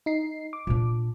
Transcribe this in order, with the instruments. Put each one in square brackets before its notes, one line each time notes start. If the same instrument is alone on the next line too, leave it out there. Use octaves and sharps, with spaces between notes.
[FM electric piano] D#4 C7
D6
[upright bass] A#2 D4